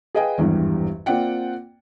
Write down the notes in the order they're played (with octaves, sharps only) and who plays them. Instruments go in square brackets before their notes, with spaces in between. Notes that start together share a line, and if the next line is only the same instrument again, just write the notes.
[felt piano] G#4 B4 D#5 F5 G5 G#5
G#1 E2 G2 E3 G3
A#3 C4 F4 D5 F#5 G5